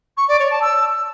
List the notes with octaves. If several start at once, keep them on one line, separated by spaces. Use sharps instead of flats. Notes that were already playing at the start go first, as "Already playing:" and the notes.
C#6
D5
C#5
A5
E6